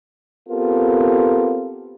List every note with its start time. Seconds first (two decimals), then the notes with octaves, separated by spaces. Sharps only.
0.49 B3 C4 F4 G4 A4 A#4